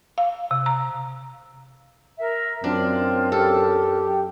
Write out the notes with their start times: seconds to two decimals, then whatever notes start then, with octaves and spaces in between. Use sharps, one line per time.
0.18 F5
0.51 C3
0.66 A#5
2.19 A#4 E5
2.64 F#2 C4 D4 F4
3.32 G4 A4